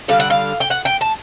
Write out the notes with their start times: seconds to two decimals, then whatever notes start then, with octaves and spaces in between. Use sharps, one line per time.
0.08 D3 G3 F5
0.20 F#5
0.30 F5
0.60 G5
0.70 F#5
0.85 G5
1.01 A5